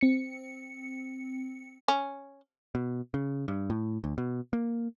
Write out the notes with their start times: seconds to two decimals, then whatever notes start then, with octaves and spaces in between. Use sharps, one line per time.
0.01 C4 C#7
1.88 C#4
2.75 B2
3.14 C#3
3.48 G2
3.70 A2
4.04 D2
4.18 B2
4.53 A#3